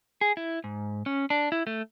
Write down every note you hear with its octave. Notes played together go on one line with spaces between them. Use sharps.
G#4
E4
G#2
C#4
D4
E4
A3